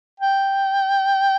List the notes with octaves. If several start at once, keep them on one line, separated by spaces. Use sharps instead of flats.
G5